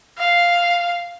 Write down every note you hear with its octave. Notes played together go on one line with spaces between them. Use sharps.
F5